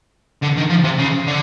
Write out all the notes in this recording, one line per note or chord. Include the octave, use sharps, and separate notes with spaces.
D3
D#3
F3
C3
C#3
D3